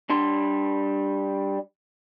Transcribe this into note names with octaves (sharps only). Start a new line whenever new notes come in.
G3 D4 C6